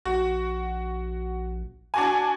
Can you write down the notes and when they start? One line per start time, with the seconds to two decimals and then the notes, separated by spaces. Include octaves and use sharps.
0.05 A#1 F#4
1.94 D4 F#4 G#5